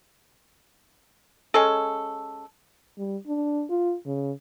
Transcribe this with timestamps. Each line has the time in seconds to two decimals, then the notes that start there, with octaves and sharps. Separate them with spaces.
1.54 G#3 C#4 A4
2.98 G3
3.27 D4
3.70 F4
4.06 C#3